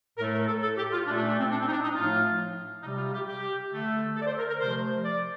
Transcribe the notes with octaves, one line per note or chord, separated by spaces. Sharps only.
A2 A3 A#4
A#4
A4
A4
G4
F4
A#2 A3 D4
D4
D4
C4
D4
C4
D#4
D4
D#4
A2 F3 A3 F4
C3 G3 D#4
F4
G4
G4
D3 A3
A4
D5
C5
A#4
A#4
C3 F3 A3 C5
D5